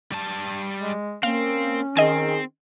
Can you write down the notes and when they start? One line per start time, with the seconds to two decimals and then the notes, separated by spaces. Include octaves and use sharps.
0.12 G3 A5
0.79 G#3
1.23 A#3 C4 C#4 F5
1.97 D#3 C4 G#4 D#5 G#5